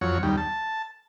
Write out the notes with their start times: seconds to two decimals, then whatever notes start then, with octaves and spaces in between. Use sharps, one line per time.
0.01 F2 F#3 C#5
0.23 D#2 G3
0.38 A5